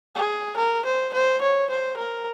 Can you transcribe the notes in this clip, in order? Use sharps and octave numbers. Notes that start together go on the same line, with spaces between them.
G#4
A#4
C5
C5
C#5
C5
A#4